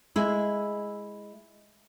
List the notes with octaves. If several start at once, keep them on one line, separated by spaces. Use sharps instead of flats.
G#3 E4